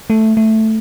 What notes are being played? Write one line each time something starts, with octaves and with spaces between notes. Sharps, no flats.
A3
A3